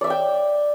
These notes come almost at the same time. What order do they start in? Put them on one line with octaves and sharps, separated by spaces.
D5 E5 E6 G5